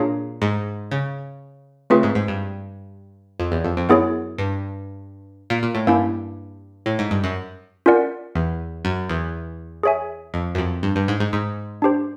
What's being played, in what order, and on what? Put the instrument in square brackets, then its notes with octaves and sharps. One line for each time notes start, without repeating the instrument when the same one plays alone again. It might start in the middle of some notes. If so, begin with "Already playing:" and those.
Already playing: [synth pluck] A#2 [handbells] D4 F4 G#4 C#5 F5
[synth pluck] G#2
C#3
[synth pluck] C#3 [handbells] A3 C4 F4 G#4 B4
[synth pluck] G#2
G#2
G2
F2
E2
F2
F2
[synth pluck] F#2 [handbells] B3 E4 G#4 C#5
[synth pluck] G2
A#2
A#2
A2
[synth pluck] G2 [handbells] A#3 C#4 E4
[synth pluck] A2
G#2
G2
F#2
[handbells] C#4 F4 A#4 D5 F#5
[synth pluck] E2
F#2
E2
[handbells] G#4 C#5 E5 G#5
[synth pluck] F2
F#2
F2
G2
G2
G#2
G#2
G#2
[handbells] D4 G4 C5